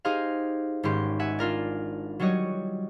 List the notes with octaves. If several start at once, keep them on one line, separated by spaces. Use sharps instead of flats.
D#4 G4 G#4 C5 D#5 F5
G#1 G#2 G#3 C#4 G4 C6
E5 F#5 G#5
D4 F4 A#4 D5
F#3 G3 F#4 C#5 D#5